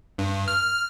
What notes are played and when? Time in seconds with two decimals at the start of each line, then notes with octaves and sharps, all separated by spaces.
0.18 G2
0.48 F6